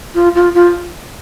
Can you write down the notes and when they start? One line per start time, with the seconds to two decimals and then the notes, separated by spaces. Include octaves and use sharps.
0.15 F4
0.35 F4
0.55 F4